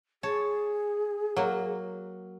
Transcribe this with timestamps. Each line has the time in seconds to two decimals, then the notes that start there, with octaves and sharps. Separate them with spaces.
0.23 G#4 C#5 A5
1.36 F#3 A#3